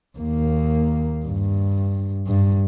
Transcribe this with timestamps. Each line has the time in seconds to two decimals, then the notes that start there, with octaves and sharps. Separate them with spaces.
0.18 D#2 A#3
1.25 G2
2.27 G2